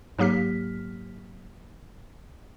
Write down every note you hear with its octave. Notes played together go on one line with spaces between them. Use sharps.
G#2 F#3 A#3 G4 F6 B6